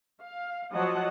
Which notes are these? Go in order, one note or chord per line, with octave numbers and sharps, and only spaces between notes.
F5
F3 F#3 D#5 F#5 A5